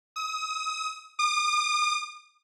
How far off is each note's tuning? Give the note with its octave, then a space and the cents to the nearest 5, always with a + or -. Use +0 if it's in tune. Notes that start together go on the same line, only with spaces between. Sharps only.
D#6 +35
D#6 -45